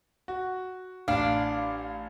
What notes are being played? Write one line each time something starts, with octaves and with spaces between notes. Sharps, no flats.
F#4
A1 D4 F5